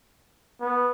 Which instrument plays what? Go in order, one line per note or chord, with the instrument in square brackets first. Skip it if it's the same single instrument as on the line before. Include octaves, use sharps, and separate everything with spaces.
[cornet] B3